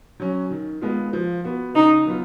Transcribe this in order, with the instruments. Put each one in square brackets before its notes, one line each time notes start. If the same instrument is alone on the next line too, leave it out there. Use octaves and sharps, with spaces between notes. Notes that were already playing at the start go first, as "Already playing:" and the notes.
[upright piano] F#3 C#4
D#3
G#3 B3 F4
F3
B3 F#4
[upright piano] C#3 [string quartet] D#4
[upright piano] F#3 B3 F4